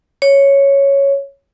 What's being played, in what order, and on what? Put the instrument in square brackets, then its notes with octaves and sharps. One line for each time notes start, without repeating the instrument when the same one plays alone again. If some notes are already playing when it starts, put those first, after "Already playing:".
[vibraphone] C#5